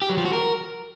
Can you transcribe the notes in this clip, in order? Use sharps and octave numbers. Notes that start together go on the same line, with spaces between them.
G4
F#3
F3
F#4
A#4